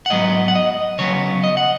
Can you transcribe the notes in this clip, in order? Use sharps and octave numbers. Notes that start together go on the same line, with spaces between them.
F#5
G#2 F#3 B3 D#5
F#5
D#5
C#3 F#3 B3 C#5
D#5
F#5